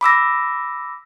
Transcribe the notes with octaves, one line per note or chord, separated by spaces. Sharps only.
B5 D6 E6 A#6